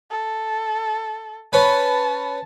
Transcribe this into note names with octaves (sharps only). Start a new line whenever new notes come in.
A4
C#4 B4 A5